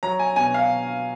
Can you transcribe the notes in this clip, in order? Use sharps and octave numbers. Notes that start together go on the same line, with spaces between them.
F#3 A#5
G#5
B2 G#5
F5